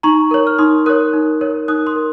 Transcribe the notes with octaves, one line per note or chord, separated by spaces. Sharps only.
D#4 A#5 C#6
A#4 C#5
F6
D#4 C6 D#6
A#4 C#5 D#6 F#6
D#4
A#4 C#5
D#4 D#6 F#6
C6 D#6
A#4